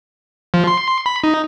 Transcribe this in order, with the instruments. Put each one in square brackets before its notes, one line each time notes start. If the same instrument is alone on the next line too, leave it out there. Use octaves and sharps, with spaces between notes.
[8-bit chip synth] F3
C6
B5
D#4